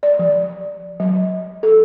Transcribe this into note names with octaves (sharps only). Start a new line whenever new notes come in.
D5
F3
F#3
A4